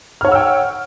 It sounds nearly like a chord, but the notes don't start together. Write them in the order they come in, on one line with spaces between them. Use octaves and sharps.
F6 C#5 F#5 E6 G5